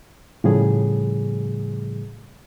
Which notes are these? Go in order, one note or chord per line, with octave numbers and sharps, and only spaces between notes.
A2 C#3 F3 G3 A3 G#4